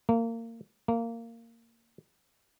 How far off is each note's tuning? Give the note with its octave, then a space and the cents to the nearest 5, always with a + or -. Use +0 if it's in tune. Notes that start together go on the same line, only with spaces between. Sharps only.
A#3 -25
A#3 -15